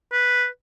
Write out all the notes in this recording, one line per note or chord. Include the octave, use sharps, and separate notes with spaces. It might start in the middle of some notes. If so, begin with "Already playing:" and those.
B4